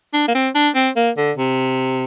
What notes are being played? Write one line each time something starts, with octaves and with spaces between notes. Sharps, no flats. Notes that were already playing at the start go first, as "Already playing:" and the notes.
D4
A#3
C4
D4
C4
A#3
D3
C3